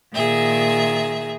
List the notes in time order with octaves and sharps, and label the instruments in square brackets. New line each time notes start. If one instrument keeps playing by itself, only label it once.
[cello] A#2 D#3 [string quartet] G#4 E5